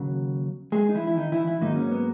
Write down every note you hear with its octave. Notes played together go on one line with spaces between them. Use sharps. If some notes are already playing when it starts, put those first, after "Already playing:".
Already playing: D#2 C#3 F#3
G#3 G#4
D#4
E3 E4
E4
D#3 D#4
E3 E4
E3 E4
G#2 D#3 F#3 A#3 D#4
C#4
B3